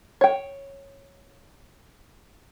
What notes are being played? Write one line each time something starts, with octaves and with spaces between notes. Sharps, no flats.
C#5 G5